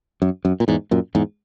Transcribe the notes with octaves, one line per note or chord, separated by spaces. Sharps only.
F#2
F#2
A#2
E2 G#2
F#2 A#2
E2 G#2